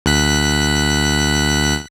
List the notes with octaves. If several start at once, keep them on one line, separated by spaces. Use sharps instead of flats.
D2 F#6 B6